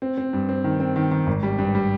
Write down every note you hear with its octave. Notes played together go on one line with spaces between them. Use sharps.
C4
C4
G2
C4
D#3
C4
D#3
D#3
G#1
G3
G2
G3